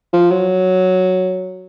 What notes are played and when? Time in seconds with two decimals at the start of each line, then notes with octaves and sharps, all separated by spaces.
0.13 F3
0.31 F#3